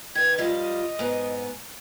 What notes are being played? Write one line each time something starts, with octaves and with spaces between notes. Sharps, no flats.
D#3 B4 G#6
F3 G3 F4 D#5
G#2 B3